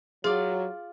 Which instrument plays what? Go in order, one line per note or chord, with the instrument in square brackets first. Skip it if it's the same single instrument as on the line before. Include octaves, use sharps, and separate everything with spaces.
[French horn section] F#3 [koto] F4 D5 [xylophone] G#4